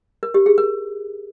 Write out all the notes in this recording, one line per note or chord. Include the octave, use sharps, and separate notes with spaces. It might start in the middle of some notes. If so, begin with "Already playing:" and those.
A#4
G4
G#4
A#4